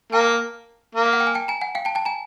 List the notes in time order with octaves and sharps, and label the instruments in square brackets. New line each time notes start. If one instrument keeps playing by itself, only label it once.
[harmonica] A#3 [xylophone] G5 A5
[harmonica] A#3
[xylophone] F5
F#5
G5
G#5
G5 A5
G#5 A#5
F#5 G#5
F5 G5
G5 A5
G5 A5
G#5 A#5